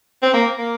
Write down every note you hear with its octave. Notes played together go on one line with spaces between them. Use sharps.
C4
A#3
A#3